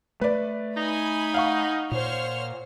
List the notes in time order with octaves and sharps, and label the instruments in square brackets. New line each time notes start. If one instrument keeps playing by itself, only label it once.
[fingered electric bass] A3 [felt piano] B4 D5
[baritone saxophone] D#4 [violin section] G#5 B5
[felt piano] F5 F#5 C#6
[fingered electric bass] A#2 [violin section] C5 C#5 F6